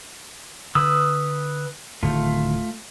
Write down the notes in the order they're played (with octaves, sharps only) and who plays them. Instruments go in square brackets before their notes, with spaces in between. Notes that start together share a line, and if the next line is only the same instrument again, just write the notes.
[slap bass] D3 [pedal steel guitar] B4 D#6 E6
[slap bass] D1 D3 D#3 [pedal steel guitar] A3 F4